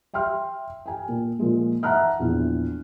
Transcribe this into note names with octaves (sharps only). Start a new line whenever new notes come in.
E5 G5 C6 F6
G5 G#5
A#2
A#2 F3 G#3
E5 F#5 A5 A#5 F6 F#6
A#1 E2